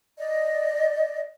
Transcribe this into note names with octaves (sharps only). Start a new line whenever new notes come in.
D5 D#5